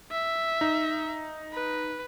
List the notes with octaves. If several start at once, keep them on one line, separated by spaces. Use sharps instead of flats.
E5
D#4
B4